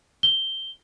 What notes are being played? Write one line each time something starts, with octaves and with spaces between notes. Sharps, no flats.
G7